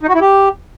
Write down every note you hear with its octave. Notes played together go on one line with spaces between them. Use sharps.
D#4
F#4
E4
G4